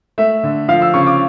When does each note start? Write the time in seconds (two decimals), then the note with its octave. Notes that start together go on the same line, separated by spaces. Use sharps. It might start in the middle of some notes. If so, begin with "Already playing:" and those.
0.18 A3 E5
0.43 D3
0.68 F3 F5
0.82 E6
0.94 C#3 C#6
1.07 D6